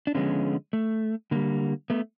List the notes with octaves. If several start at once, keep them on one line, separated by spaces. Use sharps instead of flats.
D4
D3 F3 G#3 B3 C#4
A3
D3 G3 A#3
A3 B3